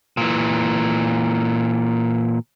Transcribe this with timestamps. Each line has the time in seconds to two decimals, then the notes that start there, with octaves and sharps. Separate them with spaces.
0.17 A#2 E3